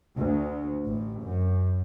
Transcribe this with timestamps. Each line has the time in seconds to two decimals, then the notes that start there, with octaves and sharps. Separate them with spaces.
0.17 D2
0.85 A1
1.24 F#2